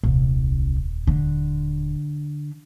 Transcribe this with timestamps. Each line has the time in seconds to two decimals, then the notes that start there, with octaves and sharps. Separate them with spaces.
0.04 D#1 C2
1.07 D3